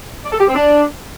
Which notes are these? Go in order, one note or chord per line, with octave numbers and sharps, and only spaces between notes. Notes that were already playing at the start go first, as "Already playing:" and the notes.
D5
A4
G4
C4
D4